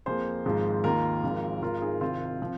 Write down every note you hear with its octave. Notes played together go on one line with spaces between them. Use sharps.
F2 F3 A#3 G#4 C5
G#1 G#2 F3 G#3
D#2 D#3 A#3 F4 A#4
G#1 G#2 F3
G#1 G#2 G#3 F4 A#4
D#4 G#4
C2 C3 D#3 C4 F4
F3